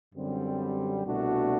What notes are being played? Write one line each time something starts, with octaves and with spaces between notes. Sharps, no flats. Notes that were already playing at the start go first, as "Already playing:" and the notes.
F#2 D3 G3 C4
C2 B2 A3 D4 F#4